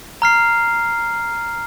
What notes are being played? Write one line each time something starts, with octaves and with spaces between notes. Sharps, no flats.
A#5 F6 C7